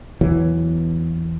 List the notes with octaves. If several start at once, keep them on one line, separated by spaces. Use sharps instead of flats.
E2 E3 F#3 B3